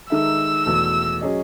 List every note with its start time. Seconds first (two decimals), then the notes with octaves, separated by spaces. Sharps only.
0.10 D#3 G#3 D#4 A4 E5 E6
0.66 E2 B2 A3
1.21 F#3 C#4 G#4 D#5